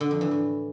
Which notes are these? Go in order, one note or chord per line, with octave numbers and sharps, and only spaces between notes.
D3
F2
E3
A2